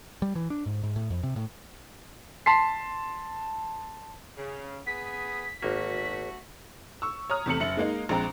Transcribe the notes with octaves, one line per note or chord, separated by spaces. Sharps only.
G3
E3
D4
G#2
G#2
A2
F2
C3
A2
A5 C6 B6 C7
C#3
B3 G#4 B6
G#1 A3 A#3 F#4
C#6 E6
C#5 A#5 D#6 F6
E2 C3 A3 C#7 F#7
F#1 E5 C#7 F#7
G#3 A#3 D#4
A#1 G#3 C4 A#5